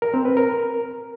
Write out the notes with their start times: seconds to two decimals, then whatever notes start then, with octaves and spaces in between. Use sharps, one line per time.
0.02 A#4
0.14 C4
0.25 B4
0.37 A#4